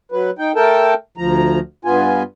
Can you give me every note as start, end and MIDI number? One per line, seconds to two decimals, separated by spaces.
0.12 0.30 54
0.12 0.30 71
0.39 0.52 63
0.39 0.52 79
0.56 0.94 57
0.56 0.94 69
0.56 0.94 70
0.56 0.94 79
0.56 0.94 81
1.18 1.59 38
1.18 1.59 53
1.18 1.59 82
1.85 2.23 43
1.85 2.23 59
1.85 2.23 65
1.85 2.23 80